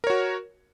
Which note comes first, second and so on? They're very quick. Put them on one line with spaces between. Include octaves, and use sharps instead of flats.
A#4 C#5 F#4